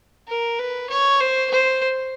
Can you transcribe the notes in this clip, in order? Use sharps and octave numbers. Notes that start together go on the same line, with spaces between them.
A#4
B4
C#5
C5
C5